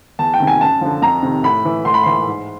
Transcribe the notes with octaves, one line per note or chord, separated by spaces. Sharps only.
E2 A5
G5
C3 D#3
G#5
F#2 A5
D3 F3
F2 A#5
C3 D#3
A2 B5
E3
A2 C6
B5
E3 C6
G#2